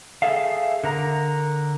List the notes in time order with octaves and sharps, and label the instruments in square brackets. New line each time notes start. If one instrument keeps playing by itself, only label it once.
[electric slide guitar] G#4 A4 E5 F5
D3 A#4 A#5